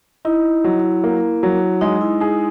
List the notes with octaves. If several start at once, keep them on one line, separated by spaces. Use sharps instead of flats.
D#4 E4
F#3
A#3
F#3
G#3 D#4
E4
D#4 G#4